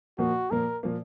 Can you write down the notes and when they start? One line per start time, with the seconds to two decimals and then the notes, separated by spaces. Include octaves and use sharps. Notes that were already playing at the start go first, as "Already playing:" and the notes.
0.18 A#2 F3 A#3 F#4
0.51 A#2 F3 A#3 A#4
0.83 A#2 F3 A#3